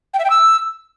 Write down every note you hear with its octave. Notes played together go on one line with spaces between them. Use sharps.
G5
E5
G5
E6